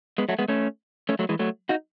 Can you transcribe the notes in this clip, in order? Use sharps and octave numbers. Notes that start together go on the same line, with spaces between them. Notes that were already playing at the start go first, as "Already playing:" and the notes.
G#3 B3
F#3 A3
G#3 B3
A3 C#4
A3 C#4
F#3 A3
E3 G#3
F#3 A3
D#4 F#4